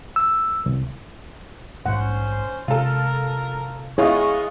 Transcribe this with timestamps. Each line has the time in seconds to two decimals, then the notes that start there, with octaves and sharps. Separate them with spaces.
0.16 E6
0.66 C2
1.86 A#1 G#2 C#4 C5 F#5
2.68 C3 G#3 F4 A4 A#4
3.98 G#3 B3 E4 F4 G#4 C#5 D#5 C#6